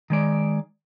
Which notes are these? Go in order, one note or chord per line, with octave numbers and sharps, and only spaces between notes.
D#3 G#3 D5